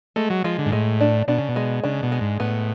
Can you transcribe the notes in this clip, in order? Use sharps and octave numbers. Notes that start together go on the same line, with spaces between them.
G#3 A3
F#3
F3 G#3
D3
G#2
A2 G#3
D4
B2 D4
C#3
B2
G#3
C#3 D4
B2
G#3
G#2
A2 B3